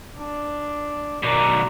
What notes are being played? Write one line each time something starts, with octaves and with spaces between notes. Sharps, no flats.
D4
B2 D#3 D5 A#5